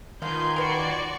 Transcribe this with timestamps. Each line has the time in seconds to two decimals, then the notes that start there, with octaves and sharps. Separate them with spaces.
0.22 D3 D#3 F4 B4 F5 G#5 C6 G6
0.56 F#4 A#4 B4 D5 C#6